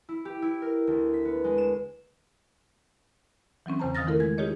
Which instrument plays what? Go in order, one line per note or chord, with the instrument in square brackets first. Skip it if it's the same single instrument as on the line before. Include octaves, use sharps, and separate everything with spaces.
[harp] E4
G4
E4
A#4
D2
B6
B3
G#3
E7
[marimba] E3 F#3 C4 C#4
E2 C#3 C5 A5 A#5
D#3 F5 D#6 F6 A6 A#6
D#3 A3 E4 F4 A4 A#4
G#3 G#6
D#4 F4 G4 G#4 C#5 D#5